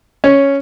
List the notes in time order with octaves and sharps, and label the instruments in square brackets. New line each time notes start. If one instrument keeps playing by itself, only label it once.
[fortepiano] C#4